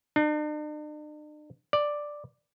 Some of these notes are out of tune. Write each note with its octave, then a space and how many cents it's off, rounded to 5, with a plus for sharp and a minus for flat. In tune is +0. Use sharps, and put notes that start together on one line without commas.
D4 +45
D5 +5